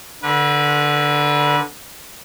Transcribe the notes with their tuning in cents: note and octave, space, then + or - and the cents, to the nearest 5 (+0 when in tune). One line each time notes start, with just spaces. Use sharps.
D3 +0 B4 -30